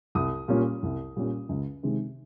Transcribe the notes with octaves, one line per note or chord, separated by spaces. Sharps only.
C2 D#6
A#2 G3 A#3 C#4
C2
A#2 G3 A#3 C#4
C#2
C3 D#3 G#3 C4